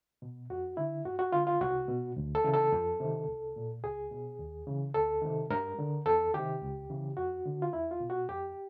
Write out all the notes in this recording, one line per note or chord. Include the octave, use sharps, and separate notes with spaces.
B2
F2 F#4
D3 E4
G2 F#4
F#4
D3 F4
F4
C2 F#4
B2
D2
A4
C#3 E3
A4
F2
C3 D#3
C2
A#2
C#2 G#4
B2
D#2
C#3 E3
D2 A4
C3 D#3
G2 A#4
D3
E2 A4
C3 D#3 G4
C#2
C#3 E3
F2 F#4
D3
F4
E2 E4
F4
B2
F#4
F2 G4